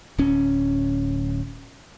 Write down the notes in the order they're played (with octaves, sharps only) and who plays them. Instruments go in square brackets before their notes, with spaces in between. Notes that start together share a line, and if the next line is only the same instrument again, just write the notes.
[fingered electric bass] D1 C#4